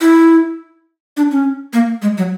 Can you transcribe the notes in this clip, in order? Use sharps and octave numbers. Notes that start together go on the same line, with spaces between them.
E4
D4
C#4
A#3
G#3
F#3